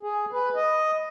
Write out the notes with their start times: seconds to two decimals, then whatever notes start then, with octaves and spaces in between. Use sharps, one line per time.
0.03 G#4
0.33 B4
0.56 D#5